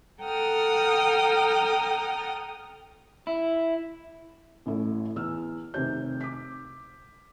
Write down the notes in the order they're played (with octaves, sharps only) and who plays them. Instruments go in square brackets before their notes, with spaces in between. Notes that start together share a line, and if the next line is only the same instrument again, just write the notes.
[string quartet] A4 F#5 G5 A#5 D#6 F6
[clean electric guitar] E4
[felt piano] A1 A3 E4
E2 E6 F6
F1 C3 D#3 G4 C5 G6
D6 B6